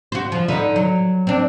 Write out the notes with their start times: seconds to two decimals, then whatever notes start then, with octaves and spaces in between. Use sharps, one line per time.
0.12 F#4 C5
0.32 F3
0.48 D3 D#4 B4
0.76 F#3
1.27 C4 D4